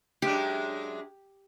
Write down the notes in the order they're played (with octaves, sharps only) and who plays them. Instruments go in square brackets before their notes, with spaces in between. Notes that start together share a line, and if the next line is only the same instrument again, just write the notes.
[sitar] F#2 G#3 D4 [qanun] G4